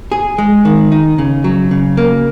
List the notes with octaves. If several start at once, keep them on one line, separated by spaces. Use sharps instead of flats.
G#4
G#3
D#3
D#4
C#3
F#3
C#3
A#3